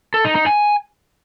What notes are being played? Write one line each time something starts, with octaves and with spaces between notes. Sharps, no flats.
A4
D#4
D#4
G#5